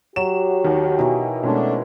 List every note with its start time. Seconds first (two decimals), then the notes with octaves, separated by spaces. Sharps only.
0.16 F#3 F#4 G4 E7
0.64 D#2 D#3
0.99 B2 D#3 E3
1.43 B2 G#3 A3 B3 C#4 D4